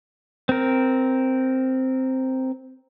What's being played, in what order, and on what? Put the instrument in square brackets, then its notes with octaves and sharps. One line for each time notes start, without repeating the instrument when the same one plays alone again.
[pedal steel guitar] C4 A#4